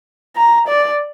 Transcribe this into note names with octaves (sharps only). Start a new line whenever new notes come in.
A#5
D5